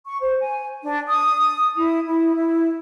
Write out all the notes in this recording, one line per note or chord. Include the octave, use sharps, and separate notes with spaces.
C#6
C5
G#5
D4
D#6
E4
E4
E4